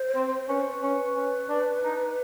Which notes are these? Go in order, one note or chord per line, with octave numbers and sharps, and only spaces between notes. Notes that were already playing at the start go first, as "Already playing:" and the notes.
Already playing: C5
C4
C#4 B4
C5
B4
C#4
C#4
D4
D#4